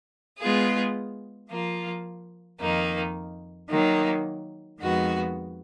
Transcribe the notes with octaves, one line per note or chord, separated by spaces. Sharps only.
G#3 B3 F4 G#4
F3 A#3 F4
F2 D#3 A#3 D#4
D#3 F#3 A#3
F2 D#3 G#3 B3 F#4